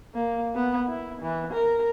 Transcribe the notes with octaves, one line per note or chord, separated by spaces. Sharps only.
A#3
B3
E4
E3
A#4